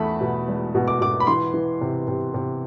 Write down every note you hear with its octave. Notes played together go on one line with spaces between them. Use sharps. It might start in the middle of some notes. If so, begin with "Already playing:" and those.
Already playing: E2 A3 A5 B5
B2
E1
B2
D6
B2 D6
B5
E3 C6
E3
C3
C3
C3